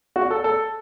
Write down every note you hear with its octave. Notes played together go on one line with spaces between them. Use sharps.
F#4
A4
A4